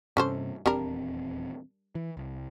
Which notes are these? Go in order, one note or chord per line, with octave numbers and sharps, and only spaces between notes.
G2 C3 C#4 A4 C5
D#1 E2 G3 C4 D4 A#4
E3
C2